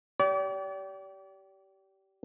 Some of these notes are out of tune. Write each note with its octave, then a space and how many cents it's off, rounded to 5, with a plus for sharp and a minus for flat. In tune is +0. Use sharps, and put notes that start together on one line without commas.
G4 -25 D5 -40